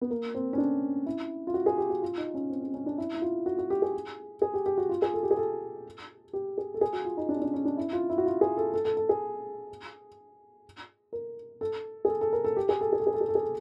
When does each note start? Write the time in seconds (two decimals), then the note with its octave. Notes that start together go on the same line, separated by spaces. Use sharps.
0.01 B3
0.11 A#3
0.35 C4
0.53 C#4
0.58 D4
1.06 E4
1.47 F4
1.54 F#4
1.66 G#4
1.78 G4
1.90 F#4
2.02 F4
2.18 D#4
2.34 C#4
2.50 C4
2.62 C#4
2.74 C#4
2.86 D4
2.98 E4
3.14 E4
3.22 F4
3.46 F#4
3.58 F#4
3.70 G4
3.82 G#4
4.42 G#4
4.54 G4
4.66 G4
4.78 F#4
4.89 F4
5.02 G#4
5.14 A4
5.23 G4
5.31 G#4
5.37 A4
6.33 G4
6.58 G#4
6.74 A4
6.81 G#4
6.93 F#4
7.05 F4
7.17 D#4
7.29 D4
7.36 C#4
7.42 D4
7.54 C#4
7.65 D4
7.77 E4
7.93 F4
8.10 E4
8.18 F#4
8.26 F4
8.41 G#4
8.57 A4
8.74 A4
8.85 A4
8.97 A4
9.09 G#4
11.13 A#4
11.61 A4
12.05 G#4
12.08 A4
12.21 A4
12.33 A#4
12.44 A4
12.57 G4
12.69 G#4
12.81 A4
12.93 G#4
13.00 A4
13.07 G#4
13.14 A4
13.21 G#4
13.29 A4
13.35 G#4
13.43 A4